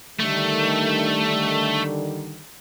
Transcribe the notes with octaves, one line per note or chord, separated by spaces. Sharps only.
D3 D#3 G3 A3